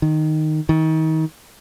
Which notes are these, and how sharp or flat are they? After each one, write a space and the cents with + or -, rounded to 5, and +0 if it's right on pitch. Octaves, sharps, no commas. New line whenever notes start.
D#3 -5
D#3 +30